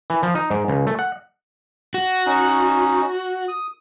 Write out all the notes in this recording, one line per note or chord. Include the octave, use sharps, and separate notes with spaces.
E3
F3
D#4
G#2
C#2
A3
F#5
F#4
C#4 D#4
D#6